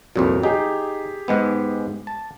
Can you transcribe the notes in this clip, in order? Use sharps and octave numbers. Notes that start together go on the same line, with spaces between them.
C2 F2 A#2 F#3
D#4 G4 G#4
G#2 G#3 B3
A5